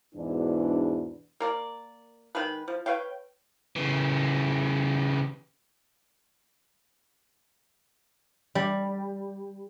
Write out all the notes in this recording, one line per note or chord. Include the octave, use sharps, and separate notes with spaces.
E2 G#2 B2 E3 D4
A#3 A#4 D5
D#3 G#3 G#4 B4
F3
B4 C#5 F5 G5
C#3 E3
G3